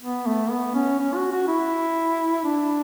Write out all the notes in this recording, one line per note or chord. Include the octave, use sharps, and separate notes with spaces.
B3
A3
B3
C#4
C#4
F#4
F#4
E4
D4